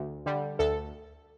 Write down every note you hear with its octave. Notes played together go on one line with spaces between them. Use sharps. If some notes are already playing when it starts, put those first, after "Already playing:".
Already playing: D2
D3 G3
D2 A4